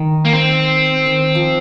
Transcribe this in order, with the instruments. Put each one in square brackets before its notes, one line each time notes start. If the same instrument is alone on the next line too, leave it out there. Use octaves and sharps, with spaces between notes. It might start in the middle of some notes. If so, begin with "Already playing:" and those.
Already playing: [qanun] D#3
[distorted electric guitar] A#3
C4
[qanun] D#3
D#3
F3